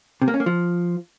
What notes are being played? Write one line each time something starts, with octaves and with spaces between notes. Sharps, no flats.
C3
A#3
C#4
A#3
F3